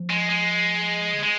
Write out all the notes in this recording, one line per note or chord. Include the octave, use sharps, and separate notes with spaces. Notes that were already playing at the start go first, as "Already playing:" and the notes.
Already playing: F3
G#3
G#3
D3
G#3